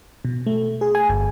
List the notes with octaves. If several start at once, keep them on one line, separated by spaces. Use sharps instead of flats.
B2
A3
G#4
G#5
G1